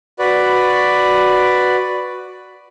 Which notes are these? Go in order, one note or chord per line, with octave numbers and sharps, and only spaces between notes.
F#4 B4 D5